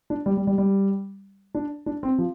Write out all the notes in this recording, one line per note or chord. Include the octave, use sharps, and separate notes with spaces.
D4
G3
G3
G3
G3
D4
D4
C4
F3